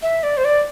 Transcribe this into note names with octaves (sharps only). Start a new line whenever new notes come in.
E5
D5
C5
D5